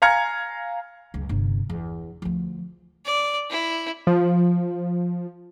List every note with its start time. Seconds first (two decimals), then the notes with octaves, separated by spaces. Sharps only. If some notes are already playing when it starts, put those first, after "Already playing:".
0.02 F5 G#5 A#5 F6 G#6 C#7
1.14 C#2 F#2
1.29 G1 C3
1.70 E2
2.22 D2 F3
3.05 D5
3.50 E4
4.07 F3